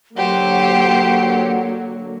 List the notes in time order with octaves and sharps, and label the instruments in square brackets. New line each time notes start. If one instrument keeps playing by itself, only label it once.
[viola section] D3 F#3 A#3 [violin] G4 C5 [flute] F#5